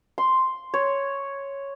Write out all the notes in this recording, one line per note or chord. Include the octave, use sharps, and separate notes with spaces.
C6
C#5